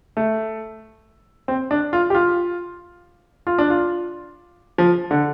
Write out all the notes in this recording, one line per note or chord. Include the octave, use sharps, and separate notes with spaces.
A3
C4
D4
F4
G4
F4
F4
D4
F4
F3
D3